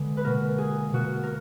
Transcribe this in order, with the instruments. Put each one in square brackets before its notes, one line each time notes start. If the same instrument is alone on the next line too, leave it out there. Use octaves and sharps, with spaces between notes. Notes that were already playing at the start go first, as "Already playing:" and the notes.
Already playing: [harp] D3 G#3 B3
B4
B2 A#3 A#4
G#4
B2 A#3 F#4
A#4